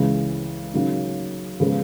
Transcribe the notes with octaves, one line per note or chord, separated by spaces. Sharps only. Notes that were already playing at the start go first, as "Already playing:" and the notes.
Already playing: C#2 C#3 E3 G#3
C#3 F#3 A#3 D#4
C#3 F3 G#3 B3